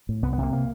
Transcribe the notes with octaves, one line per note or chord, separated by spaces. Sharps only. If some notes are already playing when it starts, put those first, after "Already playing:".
A2
C2 B3
B3
C3 A#3
A#3